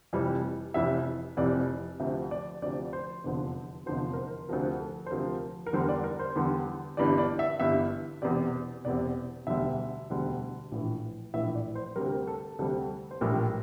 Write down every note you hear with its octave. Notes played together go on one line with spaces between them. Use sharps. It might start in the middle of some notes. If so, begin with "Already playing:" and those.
F1 F2 E3 G3
F1 F2 C3 E3 E5
F1 F2 C3 E3 D5
D2 C3 F3 E5
D5
D2 C3 F3 D5
C5
F1 E2 D3 F3 C5
F1 E2 D3 F3 C5
A#4
C5
D2 C3 F3 A#4
A4
C5
D2 C3 F3 A#4
A#4
E2 D3 G3 C5
D5
A#4
C5
E2 D3 G3
G1 G2 E3 D5
D5
E5
G1 G2 E3 E5
E1 E2 C3 D5
E1 E2 C3 D5
E1 D2 D3 G3 E5
E1 D2 D3 G3
A#1 A2 E3
A#1 A2 E3 E5
D5
C5
D2 C3 G3 A#4
A4
D2 C3 G3 A4
C5
A#1 A2 E3 G3 A#4